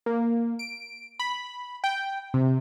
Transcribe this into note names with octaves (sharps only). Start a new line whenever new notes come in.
A#3
D7
B5
G5
C3